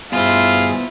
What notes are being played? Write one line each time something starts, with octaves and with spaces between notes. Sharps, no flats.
G2 B2 E4 F4 G#4 C5 F5